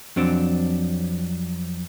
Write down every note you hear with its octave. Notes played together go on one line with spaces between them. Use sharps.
F2 F#3 C4 D4